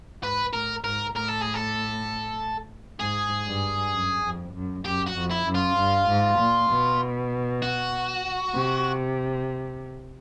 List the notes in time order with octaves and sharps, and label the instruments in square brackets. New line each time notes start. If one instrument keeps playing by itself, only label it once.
[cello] G#2 [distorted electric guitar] B4
[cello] A2 [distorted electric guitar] A#4
[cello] G#2 [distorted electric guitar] A#4
[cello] A2 [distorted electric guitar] A#4
[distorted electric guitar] A4
G#4
A4
[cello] G#2 [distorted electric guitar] G#4
[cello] G2
F#2
F2
F#2
[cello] F#2 [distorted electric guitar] G4
[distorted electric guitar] F#4
[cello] F2
[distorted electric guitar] E4
[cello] F#2
[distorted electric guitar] F4
[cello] G2
G#2
A#2
B2
[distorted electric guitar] F#4
[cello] C3